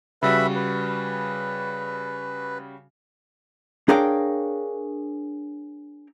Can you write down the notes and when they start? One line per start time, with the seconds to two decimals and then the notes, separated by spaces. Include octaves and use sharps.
0.23 C#3 G3 F#4 B4 E5 B5
0.55 B4
3.89 D4 G#4 A#4 C#5 F5 G5